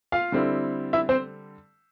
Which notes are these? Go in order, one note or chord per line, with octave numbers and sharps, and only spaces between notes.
F4 F5
D3 G3 C4 E4
E4 E5
C4 C5